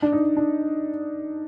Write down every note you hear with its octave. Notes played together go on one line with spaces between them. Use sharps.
D4
D#4
D4